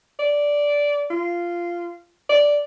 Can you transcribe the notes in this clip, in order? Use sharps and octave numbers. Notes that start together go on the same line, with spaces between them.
D5
F4
D5